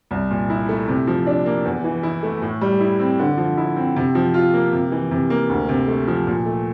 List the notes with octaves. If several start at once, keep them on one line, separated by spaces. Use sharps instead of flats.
C2
A#2
E4
A3
C3
F3
D4
A#3
E2
E3
E4
A3
A2
G3
E4
C4
D3
F3
E4
C4
C3
F3
F4
A#3
C3
E3
C3
A#3
D2
C3
A3
F3
A#2
A3